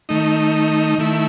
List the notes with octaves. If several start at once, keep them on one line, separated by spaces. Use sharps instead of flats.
D#3 A3 D#4
D#3 A3 E4